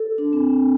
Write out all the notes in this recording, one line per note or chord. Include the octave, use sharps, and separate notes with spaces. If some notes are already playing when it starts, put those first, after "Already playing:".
Already playing: A4
D4
C4